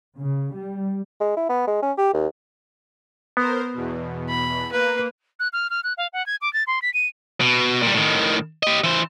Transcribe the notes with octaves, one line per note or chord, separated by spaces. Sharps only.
C#3
G3
G#3
E4
B3
G#3
C#4
G4
D#2
B3 A#4 C5
E2 B2
B5
A#3 B4
F#6
F6
F6
F#6
F5
F#5
G#6
D6
A6
C6
B6
D#7
B2
A#2 G3
A2 D#3
G4 D#5
E3 C5